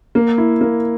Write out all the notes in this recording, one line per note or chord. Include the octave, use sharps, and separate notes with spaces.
A#3
E4
A#3